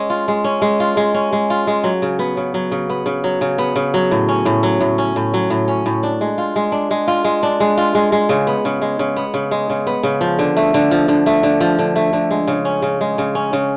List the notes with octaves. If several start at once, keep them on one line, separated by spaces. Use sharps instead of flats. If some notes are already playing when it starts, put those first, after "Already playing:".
Already playing: G#3 C#4
F4
G#3
C#4
G#3
F4
G#3
C#4
G#3
F4
G#3
F#3
C#3
B3
C#3
F#3
C#3
B3
C#3
F#3
C#3
B3
C#3
F#3
A2
C#4
A2
F#3
A2
C#4
A2
F#3
A2
C#4
A2
D4
G#3
F4
G#3
D4
G#3
F4
G#3
D4
G#3
F4
G#3
G#3
C#3
B3
C#3
G#3
C#3
B3
C#3
G#3
C#3
B3
C#3
F3
D3
A3
D3
F3
D3
A3
D3
F3
D3
A3
D3
G#3
C#3
C#4
C#3
G#3
C#3
C#4
C#3